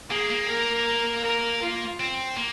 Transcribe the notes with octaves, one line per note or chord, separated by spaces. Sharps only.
A#3 G#4
A#3
A#4
A#4
F4
C4
A#3